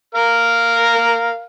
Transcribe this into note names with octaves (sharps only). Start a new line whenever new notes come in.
A#4 F5 F6